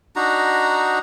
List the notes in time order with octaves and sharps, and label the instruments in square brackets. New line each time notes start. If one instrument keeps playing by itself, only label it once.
[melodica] D4 D#4 F#4 A#5